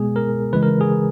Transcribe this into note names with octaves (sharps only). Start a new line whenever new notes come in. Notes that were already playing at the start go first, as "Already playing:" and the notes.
Already playing: B2 G#3 B3 G#4
A#4
C#3 E3 G#3 B4
A#4
G#4